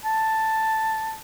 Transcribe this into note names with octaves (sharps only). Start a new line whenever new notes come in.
A5